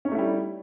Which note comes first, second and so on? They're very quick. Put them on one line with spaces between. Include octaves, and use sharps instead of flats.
C#4 D#4 A3 E4 G3